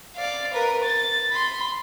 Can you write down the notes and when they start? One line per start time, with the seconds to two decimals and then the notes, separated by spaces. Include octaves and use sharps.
0.16 D5 F5
0.53 A#4 B4
0.83 A6
1.32 B5 C6